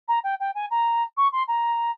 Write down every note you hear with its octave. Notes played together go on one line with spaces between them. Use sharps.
A#5
G5
G5
G#5
A#5
C#6
C6
A#5